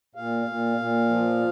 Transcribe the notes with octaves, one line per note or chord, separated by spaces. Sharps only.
A#2 F5
A#2
A#2
F3